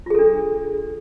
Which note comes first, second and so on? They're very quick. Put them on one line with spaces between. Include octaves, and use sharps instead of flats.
F4 G#4 A4 D4